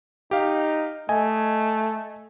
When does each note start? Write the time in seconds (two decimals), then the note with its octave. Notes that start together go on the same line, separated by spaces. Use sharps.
0.31 D#4 G4 F5
1.09 A3 D#5 G#5